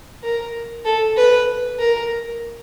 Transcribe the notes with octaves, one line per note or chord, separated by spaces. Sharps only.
A#4
A4
B4
A#4